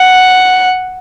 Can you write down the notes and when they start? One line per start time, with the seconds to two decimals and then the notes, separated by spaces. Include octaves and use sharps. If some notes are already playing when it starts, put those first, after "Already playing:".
Already playing: F#5